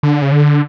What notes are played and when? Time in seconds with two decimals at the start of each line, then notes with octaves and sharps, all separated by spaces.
0.03 D3
0.22 C#3
0.32 D3